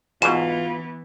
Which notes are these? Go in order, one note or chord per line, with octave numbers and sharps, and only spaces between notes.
G#2 B2 E3 B3 F4 E7